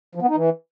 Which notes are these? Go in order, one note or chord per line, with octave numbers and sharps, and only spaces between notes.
F3
B3
D#4
E3